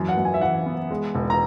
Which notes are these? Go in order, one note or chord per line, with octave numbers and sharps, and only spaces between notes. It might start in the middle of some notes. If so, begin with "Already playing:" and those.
Already playing: F#2 E3
F#5
F#2
G#5
E5
E3 F#5
B3
G#3
E1
A#5